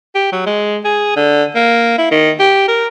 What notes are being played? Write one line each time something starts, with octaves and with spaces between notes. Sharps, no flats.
G4
F#3
G#3
G#4
D3
A#3
E4
D#3
G4
A#4